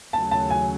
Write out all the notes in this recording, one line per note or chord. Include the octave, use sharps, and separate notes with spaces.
D#2 C#3 F#3 A3 C#4 A5
A5
G#5